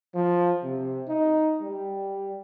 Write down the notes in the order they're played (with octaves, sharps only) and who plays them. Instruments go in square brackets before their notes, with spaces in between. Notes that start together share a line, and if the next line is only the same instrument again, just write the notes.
[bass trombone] F3
C3
D#4
G3